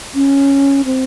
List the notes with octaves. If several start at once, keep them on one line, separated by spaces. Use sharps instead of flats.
C#4
C4